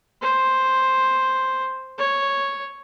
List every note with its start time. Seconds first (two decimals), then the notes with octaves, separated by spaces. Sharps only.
0.22 C5
1.98 C#5